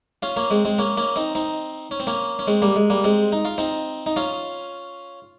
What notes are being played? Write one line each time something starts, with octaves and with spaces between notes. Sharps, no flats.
C#4 F4
A#3 C#4
G#3 C4
G#3 C4
A#3 C#4
A#3 C#4
C4 D#4
C4 D#4
C#4
C4
A#3 C#4
C#4
G#3 C4
G3 A#3
G#3
G3 A#3
G#3 C4
D#4
F4
C4 D#4
D#4
C#4 F4